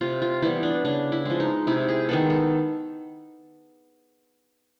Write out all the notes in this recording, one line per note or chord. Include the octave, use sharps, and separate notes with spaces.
C3 F4
F4
E3 G3 B3 E4
D4
C#3 D4
E4
F3 G#3
D#4
C3 E4
G#4
D#3 G#3 B3 A4
A4